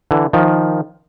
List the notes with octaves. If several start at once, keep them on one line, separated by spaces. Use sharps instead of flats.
D3 E3
D#3 F3